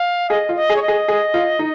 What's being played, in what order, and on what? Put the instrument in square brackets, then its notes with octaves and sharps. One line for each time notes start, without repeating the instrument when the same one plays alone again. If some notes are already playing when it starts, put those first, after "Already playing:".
Already playing: [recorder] F5
[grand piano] G#4 [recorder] D#5
[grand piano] F4
[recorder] D#5
[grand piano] G#4
[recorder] C#5
D#5
[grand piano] G#4
G#4
F4
D#4